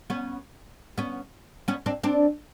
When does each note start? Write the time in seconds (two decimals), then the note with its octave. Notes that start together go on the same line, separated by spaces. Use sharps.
0.10 B3 C#4
0.98 B3 C#4
1.68 B3 C#4
1.86 C4 D4
2.03 C4 D4